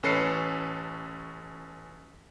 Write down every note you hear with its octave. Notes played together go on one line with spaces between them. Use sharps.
A1 C#4 A4 B4 C7 C#7